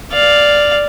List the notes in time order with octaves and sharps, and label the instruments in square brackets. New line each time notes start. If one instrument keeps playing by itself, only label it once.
[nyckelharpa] D5 F5